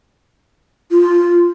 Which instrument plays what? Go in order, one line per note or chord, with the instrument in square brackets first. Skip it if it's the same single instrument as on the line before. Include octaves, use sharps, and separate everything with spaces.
[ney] F4